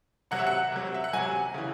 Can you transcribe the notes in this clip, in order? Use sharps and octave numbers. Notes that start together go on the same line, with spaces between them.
C3 F#3 F#5
E5
F#5
C3 F#3
E5
F#5
C3 F#3 G#5
C#3 E3